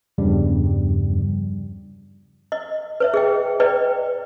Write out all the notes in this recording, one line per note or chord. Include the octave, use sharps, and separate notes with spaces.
E2 G2 C#3 F3 G3
D#5
B4 C#5 E5
G#4 D#5 G5
B4 D5 D#5 G5